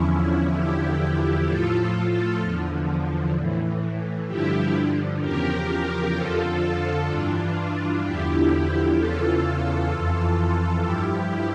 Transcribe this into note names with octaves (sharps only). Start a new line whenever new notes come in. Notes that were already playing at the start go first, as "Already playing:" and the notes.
Already playing: E2 D3 F3 C#4 E4
E2 D3 F3 E4 G4
A2 F3 F4 A4
F4 A4
F4 A4
E2 D3 F3
A2 E3
G2 D3 F3 E4 G4
E2 C#3 F3 G4 A#4
F2 D3 F3 F4 A4
G2 E3 D4 F4
E2 D3 F3 E4 G4
E2 C#3 E3 F4 A4
F2 E3
G2 F3 E4 G4